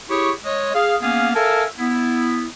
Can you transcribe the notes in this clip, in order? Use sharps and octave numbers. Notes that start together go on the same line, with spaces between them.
E4 G4 G#4 C#5 C#6
G#3 C#5 D#5
G#4 F5
A#3 B3 C#4 G#4 F5
A4 A#4 E5 F5 G#5 A5
B3 E4